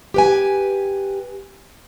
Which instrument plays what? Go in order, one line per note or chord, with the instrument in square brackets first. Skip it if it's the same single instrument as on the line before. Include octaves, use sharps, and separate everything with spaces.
[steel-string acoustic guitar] G4 B4 G#5